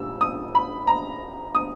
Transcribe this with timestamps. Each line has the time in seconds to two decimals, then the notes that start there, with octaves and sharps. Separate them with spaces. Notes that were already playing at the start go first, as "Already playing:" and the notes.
Already playing: A#2 G3 E6
0.21 D#6
0.55 B5
0.87 A#5
1.55 D#6